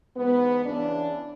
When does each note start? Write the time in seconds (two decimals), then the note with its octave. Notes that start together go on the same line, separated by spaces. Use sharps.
0.17 G#2 E3 B3
0.66 E2 C#3 E3 D4